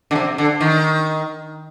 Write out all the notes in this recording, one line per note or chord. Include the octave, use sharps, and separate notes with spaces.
D3
C3
D3
D#3